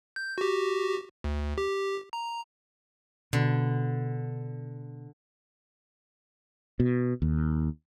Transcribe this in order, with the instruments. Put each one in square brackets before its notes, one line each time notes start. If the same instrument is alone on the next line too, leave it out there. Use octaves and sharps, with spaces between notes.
[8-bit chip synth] G6
F#4 G4
D2
G4
A#5
[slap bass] B2 [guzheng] D3
[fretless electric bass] B2
D#2